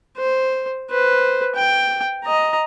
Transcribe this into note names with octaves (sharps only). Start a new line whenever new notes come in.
C5
B4 C5
G5
D#5 A#5